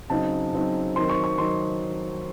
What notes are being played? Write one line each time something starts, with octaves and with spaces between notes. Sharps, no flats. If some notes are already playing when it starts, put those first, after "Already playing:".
C#3 F#3 C4 D#4 A5
C#3 F#3 C4 D#4
D#3 F#3 C4 D#4 C6
C#6
C#6
D#3 F#3 D#4 C6